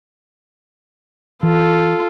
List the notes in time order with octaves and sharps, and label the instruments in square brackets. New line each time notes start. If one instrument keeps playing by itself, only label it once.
[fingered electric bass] E3 [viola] F4 A4